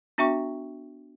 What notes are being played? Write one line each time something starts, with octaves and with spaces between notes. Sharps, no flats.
B3 D4 F#4 E5 G5 C#6